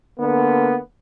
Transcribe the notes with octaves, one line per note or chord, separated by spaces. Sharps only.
D3 A#3 B3